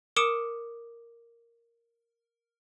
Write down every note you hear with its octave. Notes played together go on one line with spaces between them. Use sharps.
A#4 D6 D#6 C#7 D7 E7